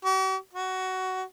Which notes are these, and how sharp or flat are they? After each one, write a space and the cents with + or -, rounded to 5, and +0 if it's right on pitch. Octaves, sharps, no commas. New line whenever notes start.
F#4 +45
F#4 +15